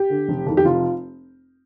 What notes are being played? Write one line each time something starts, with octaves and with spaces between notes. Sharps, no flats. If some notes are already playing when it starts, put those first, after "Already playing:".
Already playing: G4
D3
F1
F2 D#3
G4
F1 F4